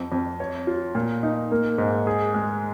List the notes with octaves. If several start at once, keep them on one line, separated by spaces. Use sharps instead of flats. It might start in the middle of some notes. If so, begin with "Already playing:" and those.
Already playing: F2
F2
C#5
F4
A#2
D#4
A#3
G#2
G#4
G#3